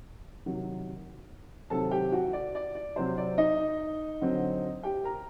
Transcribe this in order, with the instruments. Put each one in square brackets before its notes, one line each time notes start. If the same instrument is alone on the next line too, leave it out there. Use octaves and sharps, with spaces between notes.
[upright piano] C3 D#3 F#3
C3 D#3 F#3 C4 A4 A5
G4 G5
F#4 F#5
D5
D5
D5
C3 F#3 C4 C5
D5
D#4 D#5
D3 F#3 C4
G4 G5
A#4 A#5